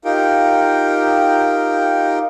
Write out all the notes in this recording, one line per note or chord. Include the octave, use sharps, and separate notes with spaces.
D#4 F4 G4 A#4 G5